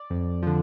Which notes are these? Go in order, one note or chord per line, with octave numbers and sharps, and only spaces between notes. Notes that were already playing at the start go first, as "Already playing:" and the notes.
Already playing: D5
F2
D3 F3